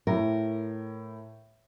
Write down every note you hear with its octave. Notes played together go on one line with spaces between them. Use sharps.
A2 A#4